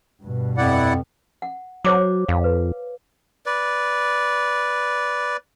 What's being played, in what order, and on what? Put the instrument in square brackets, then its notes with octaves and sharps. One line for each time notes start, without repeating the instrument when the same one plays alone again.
[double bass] G2 B2
[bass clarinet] F2 [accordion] E4 D5 F#5
[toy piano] F#5
[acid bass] F#3 [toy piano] C5 C#5 D6
[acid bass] F2 [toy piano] F5
[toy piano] B4
[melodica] B4 D5